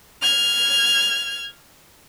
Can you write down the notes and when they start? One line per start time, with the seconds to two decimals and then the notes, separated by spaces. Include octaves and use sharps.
0.22 F6 G#6